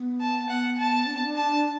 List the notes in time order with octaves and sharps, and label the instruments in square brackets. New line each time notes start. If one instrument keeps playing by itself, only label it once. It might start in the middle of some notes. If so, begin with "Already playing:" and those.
Already playing: [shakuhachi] B3
[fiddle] A5
[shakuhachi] B3 [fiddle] F#5
[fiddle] A5
[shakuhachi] D4
B3
D4
[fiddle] A5